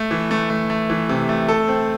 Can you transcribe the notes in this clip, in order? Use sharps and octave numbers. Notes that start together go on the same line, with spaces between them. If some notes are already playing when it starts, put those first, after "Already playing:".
Already playing: A3
E3
A3
A3
A3
E3
C3
A3
A4
C4